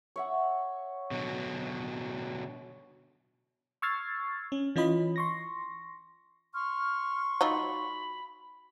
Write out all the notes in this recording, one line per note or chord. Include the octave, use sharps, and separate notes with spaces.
C#5 E5 F#5
B2 D3 F#3
C#6 E6 F6 G#6 A6 C7
C#4
E3 C#4 F4 D#5 B5
C6 C#6 A#6
C6 C#6 F6
F#3 D#4 F4 B5